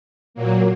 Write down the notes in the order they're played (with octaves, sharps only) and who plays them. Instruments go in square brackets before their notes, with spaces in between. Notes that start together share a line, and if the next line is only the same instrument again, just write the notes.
[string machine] A#2 F#3 A#3